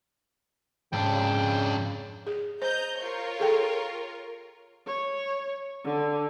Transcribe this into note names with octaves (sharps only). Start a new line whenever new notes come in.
F2 G#2 C#3 D4 G5
G#4
C5 D#5 A#5 G6
F4 A#4 C#5
G#4 A4 G5
C#5
D3